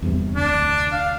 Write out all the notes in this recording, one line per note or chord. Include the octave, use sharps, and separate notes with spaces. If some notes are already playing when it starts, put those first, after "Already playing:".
E2 G2 C3
F1 D2 D4
F5